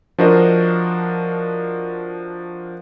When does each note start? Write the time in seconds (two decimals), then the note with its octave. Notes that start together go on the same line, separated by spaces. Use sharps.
0.18 F3 D4 F#4 A#4 C5 D#5